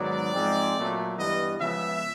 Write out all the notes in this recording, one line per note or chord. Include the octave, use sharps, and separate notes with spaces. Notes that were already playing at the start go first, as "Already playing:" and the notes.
Already playing: G#2 D#3 F#3 B3 D5
G#2 F3 G#3 C4
A#2 F#3 A3
G2 E3 G3 B3 D#5
C#3 F3 G#3 B3 E5